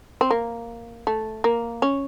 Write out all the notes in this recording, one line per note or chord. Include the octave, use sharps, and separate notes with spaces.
C4
A#3
A3
A#3
C#4